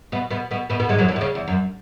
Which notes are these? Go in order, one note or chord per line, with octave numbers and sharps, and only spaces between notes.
B2 B3
B2 B3
B2 B3
B2 B3
B2 B3
G#2 G#3
F#2 F#3
E2 E3
B2
C#3
E2
F#2